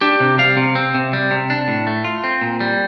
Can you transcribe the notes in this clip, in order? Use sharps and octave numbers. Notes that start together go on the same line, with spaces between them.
D4 G4
C3
G3 F5
C3
C4
C3
G3
C3
D4
A2
A3
F4
C4
A#2
G3